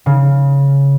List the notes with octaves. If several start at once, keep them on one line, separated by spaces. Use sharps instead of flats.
C#3